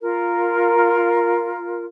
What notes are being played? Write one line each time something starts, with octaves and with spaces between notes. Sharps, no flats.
F4 A#4